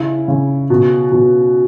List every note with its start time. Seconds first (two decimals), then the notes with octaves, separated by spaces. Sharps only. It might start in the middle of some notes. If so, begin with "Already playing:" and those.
Already playing: C#3 E4
0.28 C#3
0.70 B2
1.12 B2